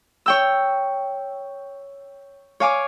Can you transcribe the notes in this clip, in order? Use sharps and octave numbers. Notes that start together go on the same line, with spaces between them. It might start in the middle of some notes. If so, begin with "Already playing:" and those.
C#5 G5 E6
C#5 F5 G#5 D6